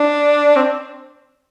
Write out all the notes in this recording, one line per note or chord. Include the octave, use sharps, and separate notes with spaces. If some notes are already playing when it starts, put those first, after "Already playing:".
Already playing: D4
C4